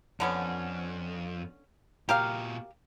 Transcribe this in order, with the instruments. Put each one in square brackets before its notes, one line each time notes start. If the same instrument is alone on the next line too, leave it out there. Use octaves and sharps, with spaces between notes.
[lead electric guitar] F2 [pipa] D3 B3 C#4
[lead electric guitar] A#2 F#4 [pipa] G4 A#4 F5